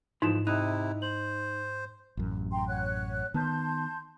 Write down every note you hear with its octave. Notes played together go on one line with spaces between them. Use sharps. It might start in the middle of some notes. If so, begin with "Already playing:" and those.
G#2 E3 F3 G#3 D#4 E4 E7
C3 D#4 E4 F#6
C5 F#7
A1 F#2
G5 A#5 C6
C#5 F#5 F#6
D#3 B3 A5 C6 G6